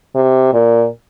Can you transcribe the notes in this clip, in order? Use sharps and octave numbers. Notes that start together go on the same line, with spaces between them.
C3
A#2